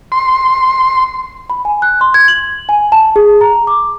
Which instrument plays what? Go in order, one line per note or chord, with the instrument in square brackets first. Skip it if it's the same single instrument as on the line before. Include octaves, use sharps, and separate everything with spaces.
[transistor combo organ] C6
[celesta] B5
G#5
F#6
C6
G#6
F#7
G#5
A5
G#4
A#5
D6